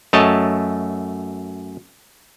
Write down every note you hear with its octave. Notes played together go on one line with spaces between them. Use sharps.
F#2 A3 C#5 D#5 A5